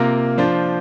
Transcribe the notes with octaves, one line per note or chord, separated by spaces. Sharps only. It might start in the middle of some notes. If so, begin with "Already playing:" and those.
Already playing: C3 A#3 F4 A#4
F3 D4 F4 C5